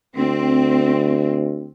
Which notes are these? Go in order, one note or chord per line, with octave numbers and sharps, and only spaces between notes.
D2 C4